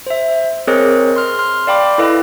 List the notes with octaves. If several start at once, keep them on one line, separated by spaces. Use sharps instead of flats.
C5 E5
C4 G#4 A#4 C5 C#5 D#5
C6 F6
C6 F6
D5 F5 G5 B5 D6
E4 A4 B4 D#5 F5